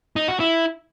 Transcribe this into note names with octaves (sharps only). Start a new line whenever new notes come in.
D#4
F#4
E4